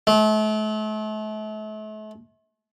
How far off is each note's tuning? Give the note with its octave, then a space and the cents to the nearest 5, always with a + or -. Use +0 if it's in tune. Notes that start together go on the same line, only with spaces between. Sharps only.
A3 -40